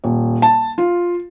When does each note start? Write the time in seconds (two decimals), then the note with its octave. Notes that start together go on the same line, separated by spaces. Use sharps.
0.04 D#1
0.42 A5
0.78 F4